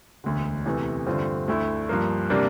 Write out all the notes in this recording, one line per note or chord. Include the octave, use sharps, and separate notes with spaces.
E1 D2 D3
E2 C3 E3 A3
G2 D3 A3 C4 F4
D2 D3 A3 E4
G2 F3 A#3
C3 G3 A#3 D4